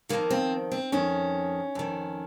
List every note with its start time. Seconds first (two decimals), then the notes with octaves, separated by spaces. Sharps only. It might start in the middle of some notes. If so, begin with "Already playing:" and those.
0.09 F2 D#3 A#3
0.30 C4
0.72 C4
0.92 F2 D#3 C#4
1.75 F2 D#3